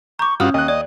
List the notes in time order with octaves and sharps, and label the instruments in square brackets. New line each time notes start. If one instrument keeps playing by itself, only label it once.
[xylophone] A#5 D6 [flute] C#6 [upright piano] G6
[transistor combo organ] G2 F4 F#4 [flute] C#4 [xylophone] D#6 F6
[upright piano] D#2 F#6 [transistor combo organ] D#5
[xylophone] D5 [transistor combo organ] D#5